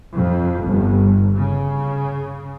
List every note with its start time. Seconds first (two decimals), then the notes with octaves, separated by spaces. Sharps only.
0.15 F2
0.64 G1
1.36 C#3